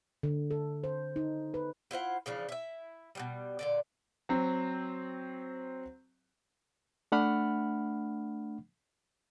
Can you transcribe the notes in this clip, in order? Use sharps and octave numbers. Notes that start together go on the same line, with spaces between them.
D3
A4
C5
D#4
B4
E4 F4 C5 F#5
C#3 E3 F3 D4
E4 E5
B2 E3 G3
A#2 D3 D5
F#3 C4
A3 D4 F#5 B5 F6